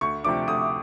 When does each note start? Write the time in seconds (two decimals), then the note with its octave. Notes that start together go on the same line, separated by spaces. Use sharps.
0.01 D2 C#6
0.24 C3 F3 A3 D4 D6
0.47 D2 D#6